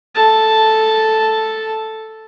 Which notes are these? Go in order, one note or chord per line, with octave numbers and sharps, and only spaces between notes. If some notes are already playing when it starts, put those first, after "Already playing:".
A4 A5